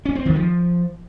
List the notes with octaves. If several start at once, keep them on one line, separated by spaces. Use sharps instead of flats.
C#4
C4
D#3
F3